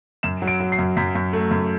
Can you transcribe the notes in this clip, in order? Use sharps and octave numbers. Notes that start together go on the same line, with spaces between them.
F#2 E7
F#3
D7
F#3
C7
F#2
F#2 B6
F#2
A3
F#2